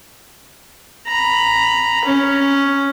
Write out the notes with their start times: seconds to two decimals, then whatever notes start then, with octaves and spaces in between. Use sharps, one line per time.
1.07 A#5 B5
2.05 C#4